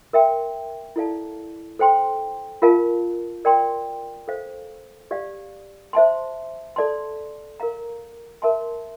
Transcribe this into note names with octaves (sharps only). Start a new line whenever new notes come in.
A#4 E5 G5 C6
E4 A4 D5 F5 A5
A4 C5 G5 C6
F4 A#4 F5 A5
A#4 D5 G5 C6
A4 C5 F5
G4 D5 F5
C5 E5 A5 C6
A4 D5 A5 C6
A#4 F5 A#5
A#4 E5 A5 C6